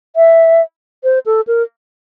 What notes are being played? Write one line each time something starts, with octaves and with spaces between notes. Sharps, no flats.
E5
C5
A4
A#4